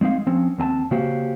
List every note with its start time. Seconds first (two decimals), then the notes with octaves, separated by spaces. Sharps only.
0.01 G#3 C4 D#4 F5
0.27 F3 C4 C#4
0.58 D#2 C4 G#5 A5
0.91 C#3 A#3 F#4 G4 C5 F5